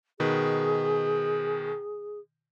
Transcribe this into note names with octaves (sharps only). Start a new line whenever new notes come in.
B2 D#3 G#4 B4